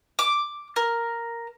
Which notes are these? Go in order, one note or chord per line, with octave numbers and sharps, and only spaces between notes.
D6
A#4